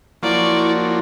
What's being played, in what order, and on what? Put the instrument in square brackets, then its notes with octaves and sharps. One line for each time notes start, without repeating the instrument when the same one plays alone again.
[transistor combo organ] F3 F#3 A#3 [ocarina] E4 [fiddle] D5 C#6